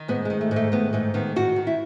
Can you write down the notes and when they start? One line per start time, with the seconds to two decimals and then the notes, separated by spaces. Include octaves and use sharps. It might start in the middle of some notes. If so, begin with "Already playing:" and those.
Already playing: D#3
0.08 G#2 B3
0.25 D#3 G#3
0.41 A3
0.51 G#2
0.56 A3
0.72 D#3 B3
0.93 G#2 A3
1.14 D#3 B3
1.36 D#3 F#4
1.56 D#3
1.67 E4